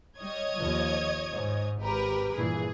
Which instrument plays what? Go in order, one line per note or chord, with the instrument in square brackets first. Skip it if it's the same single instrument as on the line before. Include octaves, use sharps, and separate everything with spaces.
[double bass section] G3 [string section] C#5 D#5 G#6
[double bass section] D#2 F3
G#2
[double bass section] G#1 [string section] G4 A#4 B4
[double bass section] G2 A#2 E3 [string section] G#4